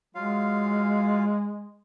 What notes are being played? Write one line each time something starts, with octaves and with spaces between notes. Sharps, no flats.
F#3 G#3 F4 F5